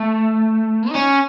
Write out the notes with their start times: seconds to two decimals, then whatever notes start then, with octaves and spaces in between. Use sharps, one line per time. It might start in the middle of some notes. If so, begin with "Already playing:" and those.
Already playing: A3
0.89 D#4
0.95 C#4